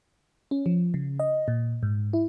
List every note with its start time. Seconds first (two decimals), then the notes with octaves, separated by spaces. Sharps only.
0.51 C#4
0.66 F3
0.94 C#3
1.20 D#5
1.48 A#2
1.83 G#2
2.13 E4